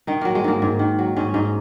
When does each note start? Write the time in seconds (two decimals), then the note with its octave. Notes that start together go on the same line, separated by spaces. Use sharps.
0.07 D#3 D#4
0.21 F#3 A#3
0.35 G#3
0.44 G#2 A#3
0.62 G#2
0.79 D#3
0.99 F#3
1.16 G#2 C#4
1.34 G#2 D#4